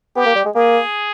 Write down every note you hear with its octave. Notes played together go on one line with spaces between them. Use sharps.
B3 G4
A#3
G3
G#3
A#3 G#4